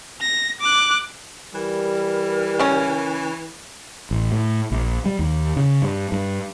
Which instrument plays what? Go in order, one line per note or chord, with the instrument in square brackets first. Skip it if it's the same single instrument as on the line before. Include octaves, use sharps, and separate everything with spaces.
[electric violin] A#6
D6 F#6
[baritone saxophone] E3 [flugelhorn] G3 [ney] A#4
[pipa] C#3 C#4
[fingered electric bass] A1
A2
A#1
G3
D#2
C#3
G2
G2